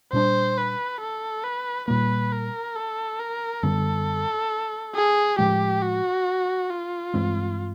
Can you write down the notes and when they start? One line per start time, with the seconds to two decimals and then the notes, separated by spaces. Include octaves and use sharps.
0.13 A#2 G3 B3 D4 C5
0.57 B4
1.01 A4
1.44 B4
1.88 A#2 G3 A#3 B4
2.32 A#4
2.76 A4
3.20 A#4
3.63 F#2 D3 G3 B3 A4
4.95 G#4
5.39 A2 F3 G#3 G4
5.82 F#4
6.70 F4
7.14 G2 E3 G#3 C4